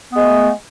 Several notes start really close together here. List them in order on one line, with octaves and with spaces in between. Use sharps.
B3 G#3 A3